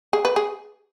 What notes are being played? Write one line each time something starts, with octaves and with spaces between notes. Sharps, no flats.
G#4
B4
G#4